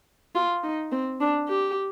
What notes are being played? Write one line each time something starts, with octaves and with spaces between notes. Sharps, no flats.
F4
D#4
C4
D4
G4